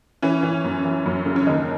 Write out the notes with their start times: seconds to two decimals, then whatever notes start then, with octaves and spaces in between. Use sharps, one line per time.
0.22 E3 C#4
0.43 E3
0.64 F#2
0.84 E3
1.06 F#2
1.26 C#3
1.36 C#4
1.47 D#2 D#4